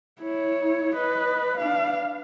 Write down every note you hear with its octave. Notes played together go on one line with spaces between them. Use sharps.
E4 C#5
B4 D#5
D4 F5